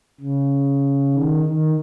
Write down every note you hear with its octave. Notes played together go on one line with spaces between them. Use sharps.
C#3
D#3
D#3